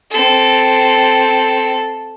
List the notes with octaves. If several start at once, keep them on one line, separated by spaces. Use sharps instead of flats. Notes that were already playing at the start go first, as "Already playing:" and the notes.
C4 A4